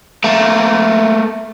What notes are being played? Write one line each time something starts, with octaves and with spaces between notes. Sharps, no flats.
A3 A#3